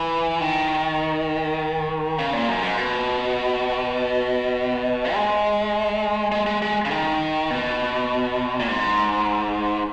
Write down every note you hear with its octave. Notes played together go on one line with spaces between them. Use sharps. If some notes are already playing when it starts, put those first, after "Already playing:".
Already playing: E3
D#3
C#3
A#2
F#2
G#2
B2
G#3
G#3
G#3
G#3
C#3
D#3
B2
A#2
G#2